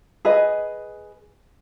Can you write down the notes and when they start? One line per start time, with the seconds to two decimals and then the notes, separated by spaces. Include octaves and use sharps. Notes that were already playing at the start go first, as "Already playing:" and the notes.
0.25 G#4 B4 D#5 G#5